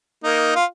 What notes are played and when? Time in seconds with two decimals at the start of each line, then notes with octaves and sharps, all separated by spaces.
0.24 A#3 D#4
0.56 F4